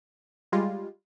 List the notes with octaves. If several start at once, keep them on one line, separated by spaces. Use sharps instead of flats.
G3 G#3 F4